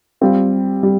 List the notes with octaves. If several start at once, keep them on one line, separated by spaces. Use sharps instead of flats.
G3 C4 F4
G3